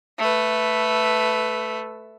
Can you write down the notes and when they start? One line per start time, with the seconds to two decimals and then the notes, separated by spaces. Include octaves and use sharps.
0.19 A3 B4